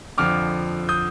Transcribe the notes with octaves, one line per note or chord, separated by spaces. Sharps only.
F2 D3 F3 D6 F6
D#6 G6